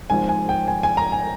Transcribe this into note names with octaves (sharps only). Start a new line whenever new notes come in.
G#1 G#2 F3 G#5
G#5
G5
G#5
G#5
A#5
G#5